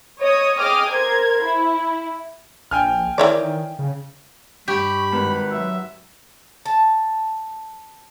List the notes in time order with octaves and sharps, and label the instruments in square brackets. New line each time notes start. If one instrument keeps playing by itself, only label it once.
[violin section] C#5 D#5 D#6
G#4 D#5 G5 D6 D#6 F6
A#4 C5 G#6
E4
[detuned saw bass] A#1 [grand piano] G5 G#5 F6
[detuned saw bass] D#3 [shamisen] E3 C#5 D5
[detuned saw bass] C#3
[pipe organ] G2 B5 [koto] G4 [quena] C#6
[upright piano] G#1 [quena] B4
[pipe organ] F#3 E5
[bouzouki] A5